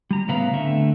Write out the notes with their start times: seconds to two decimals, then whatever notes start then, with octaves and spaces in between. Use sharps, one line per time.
0.11 G3 A#5
0.28 A2 C#3 B3 B4 F5 A#5
0.53 D3 A3 C4 E5